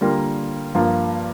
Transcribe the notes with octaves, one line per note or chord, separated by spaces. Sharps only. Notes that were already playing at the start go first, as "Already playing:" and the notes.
D3 G3 A#3 F4 A#4
G2 F3 A#3 F4